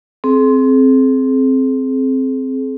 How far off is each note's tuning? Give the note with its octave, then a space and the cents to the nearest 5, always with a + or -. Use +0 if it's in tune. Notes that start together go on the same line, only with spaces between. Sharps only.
C4 +0 G#4 +45